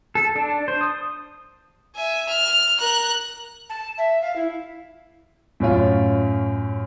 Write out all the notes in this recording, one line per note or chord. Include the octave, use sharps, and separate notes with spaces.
A4
D4
C5
D#6
E5 G#5
F6
A#4 F#6
A5
E5
F5
E4
F#2 A2 C#4 F4